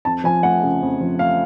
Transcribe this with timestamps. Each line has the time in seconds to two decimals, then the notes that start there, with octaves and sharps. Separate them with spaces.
0.05 F2 A5
0.24 F3 G#5
0.43 A3 F#5
0.63 C#3
0.82 F2
1.01 F3
1.19 A3 F5